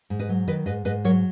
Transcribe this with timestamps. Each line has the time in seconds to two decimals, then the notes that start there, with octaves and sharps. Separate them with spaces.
0.10 G#2
0.19 B4 D#5
0.29 F#3
0.48 D#3 B4 D#5
0.66 G#2 B4 D#5
0.85 G#2 B4 D#5
1.04 F#3 A#4 C#5